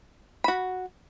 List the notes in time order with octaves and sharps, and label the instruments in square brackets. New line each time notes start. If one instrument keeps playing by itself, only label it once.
[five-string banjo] F#4 B5